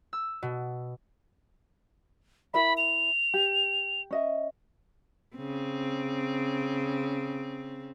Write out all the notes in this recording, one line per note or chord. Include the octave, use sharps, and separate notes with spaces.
E6
B2
E4 A#4 E5 B5
F7
G4
C#4 D#5 E5
C#3 C4